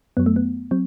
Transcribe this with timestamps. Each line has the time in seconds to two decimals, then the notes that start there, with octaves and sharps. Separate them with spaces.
0.17 F#2 F#3 B3
0.26 A3
0.36 B3
0.71 F#3 C4